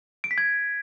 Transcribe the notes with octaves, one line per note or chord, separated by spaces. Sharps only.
D7
B6
G#6